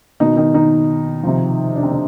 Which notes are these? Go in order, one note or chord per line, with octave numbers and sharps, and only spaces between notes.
B2 D#3 D#4
D#3 D#4
D#3 D#4
C3 F3
D4
C4
D3 D4